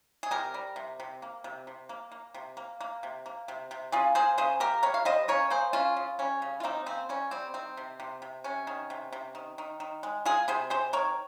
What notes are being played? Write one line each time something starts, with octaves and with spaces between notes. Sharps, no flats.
G#4
C3 G4 A#4
G3
C3
C3
A#3
C3
C3
A#3
A#3
C3
A#3
A#3
C3
A#3
C3
C3
C#3 F4 G#4
A#3 G#4 C5
C#3 G#4 C5
A#3 G4 A#4
G3 A#4 C#5
F5
G3 C5 D#5
C#3 A#4 C#5
A#3 G#4 C5
C#3 C#4 F4
C#3
G3 C#4
C#3
F4
A#3 C4 D#4
C#3 C4
G3 C#4
G3 C4
D#3 C4
C3
C3
C3
C3 C#4
D#3
C3
C3
D#3
D#3
D#3
G#3
G#3 F4 G#4
C3 G#4 C5
C3 G#4 C5
D#3 A#4 C#5